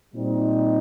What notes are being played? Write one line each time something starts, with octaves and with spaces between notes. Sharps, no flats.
A#2 G3 C4 D#4